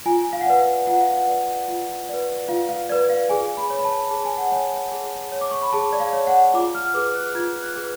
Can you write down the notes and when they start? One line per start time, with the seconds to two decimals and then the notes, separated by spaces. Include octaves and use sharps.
0.06 F4 G#5
0.33 F5
0.41 F#5
0.46 B4 D5 F5
0.59 F5
0.87 F4 F#5
1.01 F5
1.14 F#5
1.28 B4 D5
1.68 F4
2.09 B4 D5
2.48 F4 F5
2.69 F5
2.90 B4 D5
3.10 F5
3.29 G#4 G#5
3.57 B5
3.70 C#5
3.79 B5
3.84 A5
4.10 G#4 A5
4.25 G#5
4.38 F#5
4.52 C#5 G#5
4.92 G#4
5.32 C#5
5.41 D6
5.51 C#6
5.62 B5
5.73 G#4 A5
5.93 D5
6.00 F5
6.13 C#5
6.27 F#5
6.54 F4 D6
6.75 F6
6.94 G#4 B4 D6
7.15 F#6
7.35 F4 G#6
7.62 F#6
7.76 G#4 B4